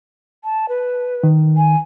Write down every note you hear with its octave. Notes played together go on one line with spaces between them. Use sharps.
A5
B4
D#3
G#5